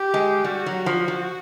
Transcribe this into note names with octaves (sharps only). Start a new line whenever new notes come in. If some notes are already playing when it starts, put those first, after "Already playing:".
Already playing: G4
G#3
G3 F#4
F#3
F#4
F3
F3